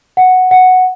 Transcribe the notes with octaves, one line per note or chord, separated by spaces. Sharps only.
F#5
F#5